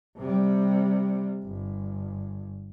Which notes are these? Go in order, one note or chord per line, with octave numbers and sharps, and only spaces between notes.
C3 G3
G1